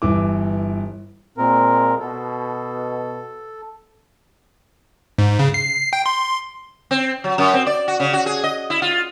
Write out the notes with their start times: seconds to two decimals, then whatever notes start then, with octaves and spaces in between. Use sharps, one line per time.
0.02 G1 E3 D6
1.38 A#2 G#3 A#3 C4 A#4
1.99 B2 A4
5.19 G#2
5.39 C#3
5.54 C7
5.93 G5
6.06 C6
6.91 C4
7.24 F#3
7.38 F#2
7.54 C4
7.67 D5
7.88 F#4
8.00 C#3
8.13 F#4
8.26 G#4
8.44 D#5
8.70 E4
8.82 F4